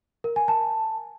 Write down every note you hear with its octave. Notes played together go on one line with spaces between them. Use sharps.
A#4
G#5
A5